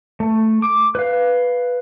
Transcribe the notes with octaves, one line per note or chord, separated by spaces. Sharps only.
A3
D6
B4 F5